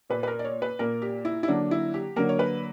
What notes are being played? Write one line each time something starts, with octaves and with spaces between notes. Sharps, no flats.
A#2 A#3 B4
B4
A#4
D5
C#5
B4
A#2 A#3 A#4
G4
E4
E4
D3 F#3 A#3 D4
E4
G4
D3 F#3 A#3 A#4
C#5
B4